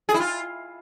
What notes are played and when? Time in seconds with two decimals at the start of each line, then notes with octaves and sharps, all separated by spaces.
0.09 G#4
0.14 E4
0.20 F4